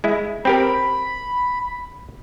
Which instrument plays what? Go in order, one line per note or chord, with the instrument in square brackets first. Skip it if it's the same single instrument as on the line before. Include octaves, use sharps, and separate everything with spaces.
[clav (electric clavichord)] G#3 E4
[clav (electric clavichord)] C4 G4 A#4 [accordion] B5